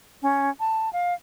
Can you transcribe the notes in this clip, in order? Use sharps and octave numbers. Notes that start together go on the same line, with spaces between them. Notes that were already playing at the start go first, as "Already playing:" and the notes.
C#4
A5
F5